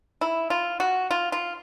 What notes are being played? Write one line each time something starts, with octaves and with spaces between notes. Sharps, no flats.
E4
F4
F#4
F4
F4